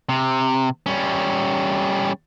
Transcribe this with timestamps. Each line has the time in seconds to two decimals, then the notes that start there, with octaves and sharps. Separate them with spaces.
0.09 C3
0.86 G3 C#4